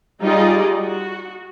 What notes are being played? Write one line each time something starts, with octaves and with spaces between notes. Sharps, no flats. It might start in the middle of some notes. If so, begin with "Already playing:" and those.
G3 D#4 F4 G#4 D5 D#5
F#4